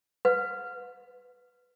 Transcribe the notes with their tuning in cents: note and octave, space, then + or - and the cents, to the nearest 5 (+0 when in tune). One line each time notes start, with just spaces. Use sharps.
B4 +5 F#5 -45